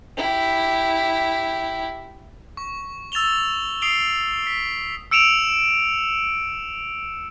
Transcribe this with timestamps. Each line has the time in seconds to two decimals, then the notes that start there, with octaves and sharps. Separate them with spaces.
0.17 E4 G4
2.57 C#6
3.12 E6 A6 E7 F7 G7
3.82 D#6 C7 D7 F7 G7
4.47 B6
5.11 E6 C#7 D7 E7 F7